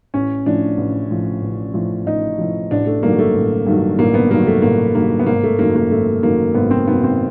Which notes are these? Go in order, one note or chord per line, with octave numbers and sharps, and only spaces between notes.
A1 C#4
A2 F3 D4
A1
A2 F3
A1
A2 F3
A1 D#4
A2 F3
A1 D4
A3
G2 D#3 F#3 A#3
A3
A1
G2 D#3 F#3
A1 A#3
B3
G2 D#3 F#3 A#3
A3
A1 A#3
G2 D#3 F#3 A#3
B3
G#1 A#3
A3
F#2 D#3 A#3
A#3
G#1 A3
F#2 D#3 A#3
G#1 B3
C4
F#2 D#3 B3
C4